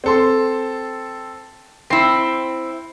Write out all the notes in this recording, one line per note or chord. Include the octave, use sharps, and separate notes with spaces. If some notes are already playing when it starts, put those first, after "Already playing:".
C4 A4 C6
C4 E4 C7